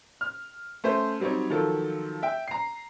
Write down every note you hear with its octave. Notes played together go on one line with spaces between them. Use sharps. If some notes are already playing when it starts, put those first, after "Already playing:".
F6
A3 C#4 C5
F#3 G3 C4 D#4 C#5
D#3 F3 F#3 A4
E5 G5
A#5 C7